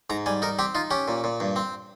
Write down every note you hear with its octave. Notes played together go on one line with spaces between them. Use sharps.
G#2 A#5
G3 G#5
D#4 A#4
C4 G4
D#4 F4
C#4 G4
A#2
A#2
G2
C4